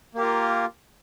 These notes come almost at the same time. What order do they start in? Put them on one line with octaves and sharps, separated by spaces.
A#3 G4 A#4 F4